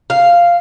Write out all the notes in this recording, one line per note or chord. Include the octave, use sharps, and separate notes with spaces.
F5